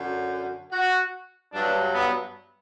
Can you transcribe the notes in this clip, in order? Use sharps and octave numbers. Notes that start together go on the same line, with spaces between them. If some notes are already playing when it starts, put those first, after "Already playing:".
Already playing: F#2 D3 F#3
F#4
G2 F#3 D4
B3